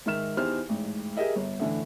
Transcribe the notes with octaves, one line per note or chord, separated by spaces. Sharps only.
G#2 D#3 E5 F6 E7
E2 D#4 G4 C5 F6
A1 G#2
G4 G#4 A#4 D#5 E5
G1
A2 D3 E3